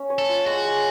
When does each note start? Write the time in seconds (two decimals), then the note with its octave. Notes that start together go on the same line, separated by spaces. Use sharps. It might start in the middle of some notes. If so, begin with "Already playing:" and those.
Already playing: C#4
0.10 C#5
0.19 A4
0.29 F4
0.46 G#3 F#4
0.65 G#3